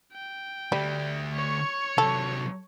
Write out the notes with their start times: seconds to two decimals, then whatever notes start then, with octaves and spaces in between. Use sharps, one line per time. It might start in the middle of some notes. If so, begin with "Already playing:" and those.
0.14 G5
0.72 D3 G3 A3
1.34 C#5 C#6
1.98 C3 F#3 A4